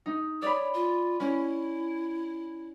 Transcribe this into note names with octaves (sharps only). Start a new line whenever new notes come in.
D#4
C#5 D5 B5
F4
C#4 E4